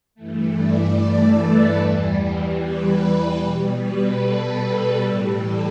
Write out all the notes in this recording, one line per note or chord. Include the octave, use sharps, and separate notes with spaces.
G2 E3 A3
D5
A4
B4
E2 E3 G3
B4
B2 G3
B4
A4
A4
A2 E3 G3
A4